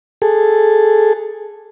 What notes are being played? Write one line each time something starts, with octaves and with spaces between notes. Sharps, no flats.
G#4 A4